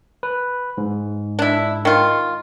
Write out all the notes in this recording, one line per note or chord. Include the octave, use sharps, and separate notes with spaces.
B4
G#2
D4 E4
D#3 F4